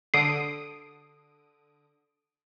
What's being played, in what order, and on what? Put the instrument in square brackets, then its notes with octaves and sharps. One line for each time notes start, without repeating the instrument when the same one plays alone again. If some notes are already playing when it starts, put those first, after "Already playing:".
[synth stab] D3 D#6 D7 [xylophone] C7